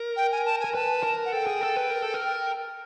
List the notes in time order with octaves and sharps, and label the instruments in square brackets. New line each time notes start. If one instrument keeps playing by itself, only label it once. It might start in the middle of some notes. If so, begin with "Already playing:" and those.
Already playing: [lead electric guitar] A#4
[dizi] G5
G#5
A5
[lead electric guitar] A#4 [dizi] G#5
[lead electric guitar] B4 [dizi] A5
[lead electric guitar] A#4
[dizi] F#5
[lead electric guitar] A4 [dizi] G5
[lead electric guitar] G#4
A4
B4
A#4
A4
A#4